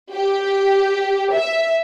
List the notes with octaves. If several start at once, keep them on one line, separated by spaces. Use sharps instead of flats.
G4
E5